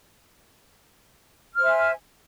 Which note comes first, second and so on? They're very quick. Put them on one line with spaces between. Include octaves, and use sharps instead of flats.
F6 C5 E5 G#5